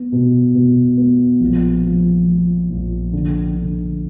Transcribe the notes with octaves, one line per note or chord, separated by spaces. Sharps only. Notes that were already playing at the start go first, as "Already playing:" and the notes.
Already playing: B3
B2
B2
B3
A#1
F3
F3
A#1
D3
D3